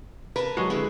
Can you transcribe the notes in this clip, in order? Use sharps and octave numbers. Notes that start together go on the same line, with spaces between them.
A#4 B4 A5
F#3 G#3 F#4
D3 C#4 E4 G#4 B4